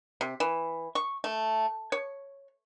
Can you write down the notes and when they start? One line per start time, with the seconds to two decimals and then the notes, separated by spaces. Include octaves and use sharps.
0.21 C3
0.40 E3
0.95 C#6
1.24 A3
1.92 C#5